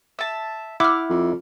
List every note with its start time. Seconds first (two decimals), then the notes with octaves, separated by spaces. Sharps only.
0.19 E5 A5
0.80 E4 E5 F#5 D6 F6
1.09 F2